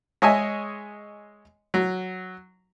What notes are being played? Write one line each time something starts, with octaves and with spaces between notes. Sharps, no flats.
G#3 C#5 D#5 E5 G#5
F#3